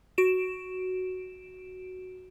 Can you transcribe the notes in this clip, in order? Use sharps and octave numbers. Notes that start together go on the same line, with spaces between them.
F#4 D7 E7